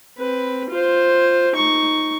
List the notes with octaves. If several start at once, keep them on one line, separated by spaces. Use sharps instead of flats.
C4 B4
F4 C5
D#4 C#6